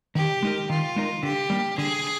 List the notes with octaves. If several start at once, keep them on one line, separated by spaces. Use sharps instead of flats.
D#3 G4
G#3 D#4 A#4
D#3 F4
G#3 D#4 A#4
D3 G4
G3 A#3
D3 G#4